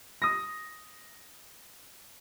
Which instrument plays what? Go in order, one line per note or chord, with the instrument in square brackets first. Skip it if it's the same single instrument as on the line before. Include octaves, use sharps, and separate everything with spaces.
[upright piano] D#6 A#6